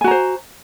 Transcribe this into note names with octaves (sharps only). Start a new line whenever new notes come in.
F#4 C5 G#5 A#5